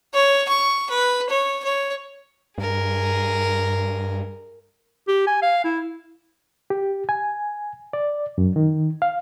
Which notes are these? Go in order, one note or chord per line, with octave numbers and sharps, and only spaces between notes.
C#5
C#6
B4
C#5
C#5
G2 G#4 A#4
G4
G#5
F5
E4
G4
G#5
D5
F#2
D#3
F5